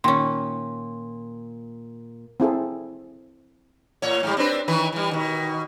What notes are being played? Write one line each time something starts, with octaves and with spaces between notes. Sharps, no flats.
A#2 D#3 C#4 C6
C4 E4 G#4 A4
A2 C#5
G#2 G3
C4 D4 B4
D#3 E3 B4
E3 G3
B2 D#3